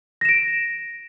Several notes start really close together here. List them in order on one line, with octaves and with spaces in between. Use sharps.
A#6 E7 D7